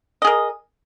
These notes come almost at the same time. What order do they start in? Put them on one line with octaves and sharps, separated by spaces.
D#5 G#4 A#4